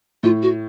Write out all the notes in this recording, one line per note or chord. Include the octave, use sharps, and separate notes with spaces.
A2 F4
F#4